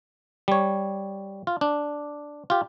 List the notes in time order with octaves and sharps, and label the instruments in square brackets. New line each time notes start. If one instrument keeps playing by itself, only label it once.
[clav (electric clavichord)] G3 C#5
F4
D4
F4 G4